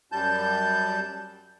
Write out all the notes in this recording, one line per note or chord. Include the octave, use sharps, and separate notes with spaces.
F#2 G3 A5 G6